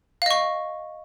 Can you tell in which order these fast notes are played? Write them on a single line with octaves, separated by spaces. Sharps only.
F5 D#5 C#6